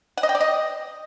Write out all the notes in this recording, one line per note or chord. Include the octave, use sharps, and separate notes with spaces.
F#5
D#5
G5
D5
D#5